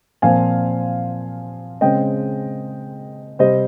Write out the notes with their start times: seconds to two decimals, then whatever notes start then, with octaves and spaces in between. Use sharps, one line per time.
0.22 A#2 F3 C4 F5 G#5
1.81 C#3 G#3 C4 D#5 G5
3.39 C3 G3 C4 C5 D#5